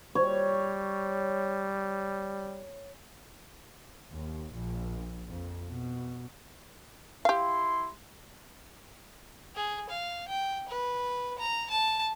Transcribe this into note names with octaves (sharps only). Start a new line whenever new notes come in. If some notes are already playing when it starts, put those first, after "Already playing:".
G3 C#5
D#2
A#1
F2
B2
E4 G4 F5 C6
G#4
F5
G5
B4
A#5
A5